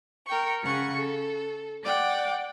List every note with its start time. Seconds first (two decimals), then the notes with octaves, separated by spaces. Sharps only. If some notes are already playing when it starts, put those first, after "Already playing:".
0.26 A#4 G5 C#6
0.63 C#3 F#5 C#6
0.97 A4
1.84 D5 F#5 G5 D6